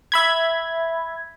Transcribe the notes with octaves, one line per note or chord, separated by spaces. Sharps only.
E5 B5 G#6